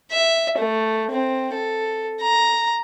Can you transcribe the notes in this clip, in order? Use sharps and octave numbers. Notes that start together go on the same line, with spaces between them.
E5
A3
C4
A4
A#5